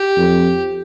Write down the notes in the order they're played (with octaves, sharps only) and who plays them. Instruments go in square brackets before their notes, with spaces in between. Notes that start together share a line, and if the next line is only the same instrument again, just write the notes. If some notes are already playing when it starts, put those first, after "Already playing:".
Already playing: [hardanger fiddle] G4
[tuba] F2